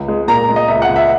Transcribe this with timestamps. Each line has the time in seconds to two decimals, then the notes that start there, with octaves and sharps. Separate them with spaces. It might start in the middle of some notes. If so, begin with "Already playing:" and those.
Already playing: C#2
0.08 G#3
0.28 A#2 A#5
0.49 G#3
0.56 D#5
0.68 C#2 E5
0.82 F#5
0.88 C#2
0.96 E5